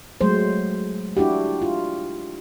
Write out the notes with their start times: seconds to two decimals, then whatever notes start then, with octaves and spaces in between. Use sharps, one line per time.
0.21 F#3 G#3 A3 C5
1.17 D4 E4 F#4 G4
1.62 F4